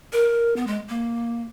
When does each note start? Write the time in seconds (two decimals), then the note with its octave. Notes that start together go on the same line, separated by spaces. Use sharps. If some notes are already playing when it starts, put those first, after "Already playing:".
0.13 A#4
0.56 B3
0.67 G#3
0.89 A#3